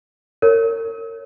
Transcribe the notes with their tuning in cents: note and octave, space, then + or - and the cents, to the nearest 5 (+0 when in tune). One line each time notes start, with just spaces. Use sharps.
A#4 -35 C#5 +0